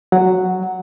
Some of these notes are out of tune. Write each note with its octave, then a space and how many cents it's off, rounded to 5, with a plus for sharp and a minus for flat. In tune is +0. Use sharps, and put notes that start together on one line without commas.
F#3 +0 F#5 +0